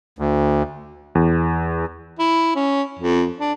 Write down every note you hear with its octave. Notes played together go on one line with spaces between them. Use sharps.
D2
E2
E4
C#4
F2
D4